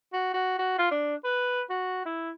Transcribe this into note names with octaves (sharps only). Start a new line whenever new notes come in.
F#4
F#4
F#4
F4
D4
B4
F#4
E4